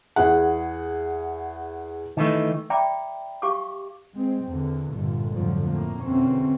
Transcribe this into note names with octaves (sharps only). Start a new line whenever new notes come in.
E2 G#4 F#5
D#3 E3 A3
D5 E5 G5 A#5 B5 D6
G4 F5 C#6 D6
G#3 C4
E2 D3
G1 A#2 D3
F2 G#2 D3 F3 F#3
A2 A#3
E2 B2 D3 E3 C4 C#4